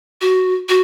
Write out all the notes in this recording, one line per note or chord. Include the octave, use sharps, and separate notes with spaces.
F#4
F#4